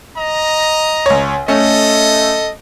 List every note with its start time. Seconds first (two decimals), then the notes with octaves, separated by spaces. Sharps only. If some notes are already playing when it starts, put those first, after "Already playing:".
0.16 D#5 A#5
1.06 C#2 C#5
1.48 A3 C#4 A4 D#5